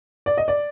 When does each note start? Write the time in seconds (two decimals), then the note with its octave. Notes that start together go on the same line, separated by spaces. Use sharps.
0.26 D5
0.37 D#5
0.48 D5